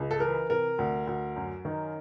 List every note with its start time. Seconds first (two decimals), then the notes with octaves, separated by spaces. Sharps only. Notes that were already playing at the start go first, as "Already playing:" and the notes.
Already playing: C#2
0.11 A4
0.20 E3 A#4
0.50 C3 A#4
0.79 D2
1.07 D2
1.36 F#2
1.65 D#3